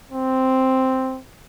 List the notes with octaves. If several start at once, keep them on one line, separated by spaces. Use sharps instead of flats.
C4